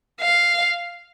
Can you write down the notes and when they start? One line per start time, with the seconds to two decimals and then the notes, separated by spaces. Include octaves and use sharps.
0.21 F5